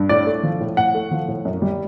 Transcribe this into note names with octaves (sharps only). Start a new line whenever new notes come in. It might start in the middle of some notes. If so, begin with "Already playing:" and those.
Already playing: G2
A2 D5
A3
F3
A2
A2 F#5
A3
F3
A2
F#2
G3